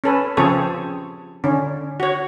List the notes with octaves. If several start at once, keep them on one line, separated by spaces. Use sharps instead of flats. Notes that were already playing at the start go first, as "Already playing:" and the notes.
C#4 A4 B4
C#3 F3 C4 G#4 A4 C#5
D3 C#4
F#4 C#5